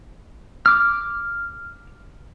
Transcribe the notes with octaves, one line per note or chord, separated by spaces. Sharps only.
D6 F6